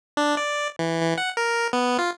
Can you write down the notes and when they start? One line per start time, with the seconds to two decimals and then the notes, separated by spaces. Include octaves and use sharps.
0.17 D4
0.37 D5
0.79 E3
1.01 E3
1.18 F#5
1.37 A#4
1.73 B3
1.99 F4